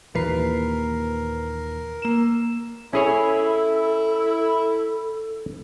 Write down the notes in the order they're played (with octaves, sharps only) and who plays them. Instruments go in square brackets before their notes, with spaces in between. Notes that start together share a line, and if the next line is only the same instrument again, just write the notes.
[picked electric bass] D#2 A#2 [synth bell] E3 B4 C7 [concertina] A#4
[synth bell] A#3 E7
[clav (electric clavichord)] C#4 G#4 C#5 [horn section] E4 [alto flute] A4